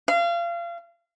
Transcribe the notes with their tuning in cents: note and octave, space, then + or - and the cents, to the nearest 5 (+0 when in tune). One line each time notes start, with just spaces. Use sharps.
F5 -30